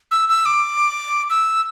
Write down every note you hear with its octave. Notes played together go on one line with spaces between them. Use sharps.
E6
E6
D6
E6